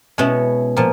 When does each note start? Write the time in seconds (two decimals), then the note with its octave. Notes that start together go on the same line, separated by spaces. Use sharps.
0.18 B2 G#3 C#4 E4
0.77 A#2 F3